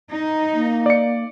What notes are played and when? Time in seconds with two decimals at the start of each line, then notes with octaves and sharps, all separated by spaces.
0.11 D#4
0.54 A#3
0.86 D5 C#7